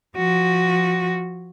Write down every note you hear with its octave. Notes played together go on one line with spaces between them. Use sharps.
F3 F#4